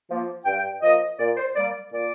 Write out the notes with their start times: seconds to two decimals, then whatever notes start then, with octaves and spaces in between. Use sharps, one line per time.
0.09 F3 A#3
0.46 G2 G5
0.82 F3 A#3 D#5
1.19 A#2 D5
1.37 C5
1.56 A#3 D5
1.60 G3
1.92 A#2 D5